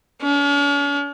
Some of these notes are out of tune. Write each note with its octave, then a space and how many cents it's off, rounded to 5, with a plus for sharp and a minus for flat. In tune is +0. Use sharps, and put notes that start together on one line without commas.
C#4 +45